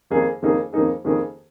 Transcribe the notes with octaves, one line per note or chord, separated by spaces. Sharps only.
F2 D#3 A#3 D#4 G#4
F2 D#3 A#3 D#4 G#4
F2 D#3 A#3 D#4 G#4
F2 D#3 A#3 D#4 G#4